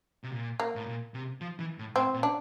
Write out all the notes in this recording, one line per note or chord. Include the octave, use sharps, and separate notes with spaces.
C3
A#2
A#3
A2
A#2
C3
F3
E3
A2
A2 C4
A#2
D4